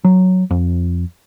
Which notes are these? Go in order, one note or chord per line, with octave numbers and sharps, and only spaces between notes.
F#3
F2